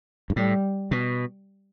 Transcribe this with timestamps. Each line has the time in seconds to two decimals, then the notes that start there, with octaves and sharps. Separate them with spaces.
0.30 G2
0.36 A2 G3
0.91 B2